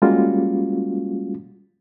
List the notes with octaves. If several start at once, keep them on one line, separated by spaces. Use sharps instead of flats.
G3 G#3 A#3 C#4 F4 F#4